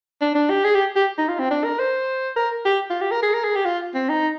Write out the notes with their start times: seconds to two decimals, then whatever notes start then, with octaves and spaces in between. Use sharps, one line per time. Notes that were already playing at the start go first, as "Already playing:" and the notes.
0.21 D4
0.35 D4
0.50 G4
0.64 G#4
0.75 G4
0.96 G4
1.18 D#4
1.29 F4
1.39 C4
1.51 D4
1.64 A#4
1.79 C5
2.36 A#4
2.65 G4
2.90 F4
3.01 G4
3.11 A#4
3.22 G#4
3.34 A#4
3.44 G#4
3.55 G4
3.65 F4
3.94 C4
4.09 D#4